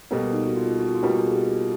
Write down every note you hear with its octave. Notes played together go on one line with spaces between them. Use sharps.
B2 G3 A#3 A4
D#4
F#4
F4
F#4
F4
B2 G3 A#3 F#4
G#4
G4